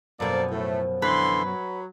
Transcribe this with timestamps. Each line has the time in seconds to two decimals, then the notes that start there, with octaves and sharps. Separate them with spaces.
0.20 F#2 B2 F3 A#3 A4 D5
0.51 A2 A3
1.02 D3 E3 B4 C6
1.45 F#3